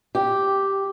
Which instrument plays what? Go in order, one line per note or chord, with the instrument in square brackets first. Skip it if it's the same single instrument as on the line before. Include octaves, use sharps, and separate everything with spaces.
[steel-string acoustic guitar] G4